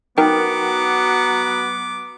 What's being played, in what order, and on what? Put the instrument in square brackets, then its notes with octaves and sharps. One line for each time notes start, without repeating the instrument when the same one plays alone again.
[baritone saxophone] F#3 [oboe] B3 [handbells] D#4 A#4 G5 [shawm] D6